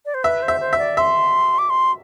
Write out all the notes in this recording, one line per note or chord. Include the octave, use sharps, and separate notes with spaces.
D5
C5
B4 E5
C5
E5
C5
E5
D5
E5 C6
D6
C6